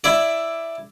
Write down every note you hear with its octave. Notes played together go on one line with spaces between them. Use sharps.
E4 D5